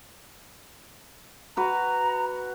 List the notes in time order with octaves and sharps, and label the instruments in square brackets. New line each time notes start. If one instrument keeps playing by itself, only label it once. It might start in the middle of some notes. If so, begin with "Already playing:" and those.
[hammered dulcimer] F#4 B4 [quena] A#5